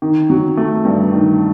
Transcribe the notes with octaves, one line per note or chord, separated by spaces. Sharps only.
D#3
F#3
A3
G2
D#3